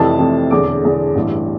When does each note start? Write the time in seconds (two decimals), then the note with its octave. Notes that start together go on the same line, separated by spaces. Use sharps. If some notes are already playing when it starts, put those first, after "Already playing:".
Already playing: F1 F2 C3 E3 A5
0.19 F1 F2 C3 E3
0.51 E1 E2 D3 D6
0.83 E1 E2 D3
1.15 A1 G2 E3